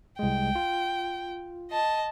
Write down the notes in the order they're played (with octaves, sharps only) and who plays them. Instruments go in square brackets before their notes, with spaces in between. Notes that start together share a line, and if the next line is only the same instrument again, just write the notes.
[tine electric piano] C2 G#3 [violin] G5
[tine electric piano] F4
[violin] D#5 A5